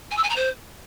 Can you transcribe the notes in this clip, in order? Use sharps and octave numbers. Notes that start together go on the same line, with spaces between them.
G#5
E6
G#5
A#5
C5